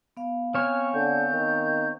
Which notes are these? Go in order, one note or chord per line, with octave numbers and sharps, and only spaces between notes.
B3 F5
C4 C#5 G#5 F6
D3 G6
D#3